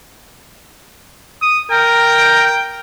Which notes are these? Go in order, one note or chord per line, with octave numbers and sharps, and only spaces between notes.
D#6
A#4 G5